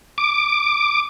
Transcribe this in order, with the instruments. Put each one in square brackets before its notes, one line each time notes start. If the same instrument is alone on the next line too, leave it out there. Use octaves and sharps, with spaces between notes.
[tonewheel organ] D6